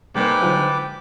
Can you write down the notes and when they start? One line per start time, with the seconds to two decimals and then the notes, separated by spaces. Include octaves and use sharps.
0.15 G#2 C3 G3 A#3 B4 G5 D6
0.41 D3 F3 F#3